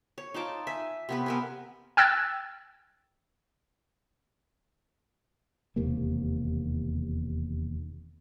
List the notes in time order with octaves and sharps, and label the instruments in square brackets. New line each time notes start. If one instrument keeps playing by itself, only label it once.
[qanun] C#5
D#4 F4 A5 D6
E5 G#5
C3 B3 B4
B3 A#4 G#5
[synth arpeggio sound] G5 E6 F#6 G#6 A6
[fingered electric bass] E1 D#2 C3 A#3